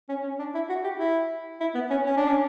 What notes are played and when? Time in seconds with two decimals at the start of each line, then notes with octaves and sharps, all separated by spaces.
0.09 C#4
0.24 C#4
0.39 D4
0.54 E4
0.69 F#4
0.84 G4
0.99 E4
1.60 E4
1.75 B3
1.90 C#4
2.06 C#4
2.17 D4
2.28 C#4